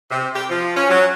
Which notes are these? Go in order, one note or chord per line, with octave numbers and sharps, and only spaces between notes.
C3
G4
F3
C#4
F#3